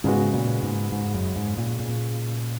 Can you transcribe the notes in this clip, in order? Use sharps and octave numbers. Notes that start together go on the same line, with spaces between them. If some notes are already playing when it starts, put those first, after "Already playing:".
G#2 C#3 G#3 B3 F#4
A#2
G#2
G#2
F#2
G#2
A#2
A#2